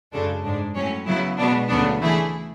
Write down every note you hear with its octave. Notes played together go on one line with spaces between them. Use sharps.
F#2 C#3 G#3 D4 A4
G#2 G#3 D4
A2 F#3 C#4
C#3 F#3 B3 E4
B2 G#3 B3 D4
D2 C#3 F#3 B3 D4
E3 A3 E4 G#4